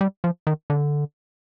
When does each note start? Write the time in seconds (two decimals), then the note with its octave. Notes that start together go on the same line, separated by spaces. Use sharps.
0.01 G3
0.24 F3
0.47 D#3
0.70 D3